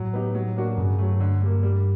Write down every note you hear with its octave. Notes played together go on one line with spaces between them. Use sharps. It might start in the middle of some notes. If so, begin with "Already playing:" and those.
Already playing: A2 F#3
B3 D#4 G4
F#3
A#3 D4 F#4
G2 C#3
F#3 A3
D3
G3 A#3
G3